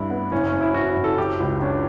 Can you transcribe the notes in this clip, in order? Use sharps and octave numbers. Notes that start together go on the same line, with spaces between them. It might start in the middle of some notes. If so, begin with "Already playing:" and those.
Already playing: G2 E4
B3
F#1 C#4
C#4
F#2
E4
F#1 F#4
E4
F#1
A4
F#3 G4
C#2
C#4 D4